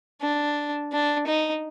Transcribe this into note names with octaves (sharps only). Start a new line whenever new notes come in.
D4
D4
D#4